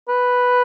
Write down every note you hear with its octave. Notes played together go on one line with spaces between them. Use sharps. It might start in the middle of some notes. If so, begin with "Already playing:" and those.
B4